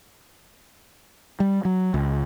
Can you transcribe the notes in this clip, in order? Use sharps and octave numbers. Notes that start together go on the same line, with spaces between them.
G3
F#3
C#2